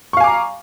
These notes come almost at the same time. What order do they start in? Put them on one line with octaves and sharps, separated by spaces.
C#6 F5 G#5 D6 A#5